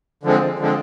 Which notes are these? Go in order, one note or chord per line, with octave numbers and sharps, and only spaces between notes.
D3 F3 G#3 C4
D3 F3 G#3 C4